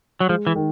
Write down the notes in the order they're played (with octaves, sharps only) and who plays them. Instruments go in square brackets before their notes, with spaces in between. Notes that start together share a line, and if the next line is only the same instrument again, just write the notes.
[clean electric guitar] F#3
[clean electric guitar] F3 [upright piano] G#3
[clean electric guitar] E3
[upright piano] D#3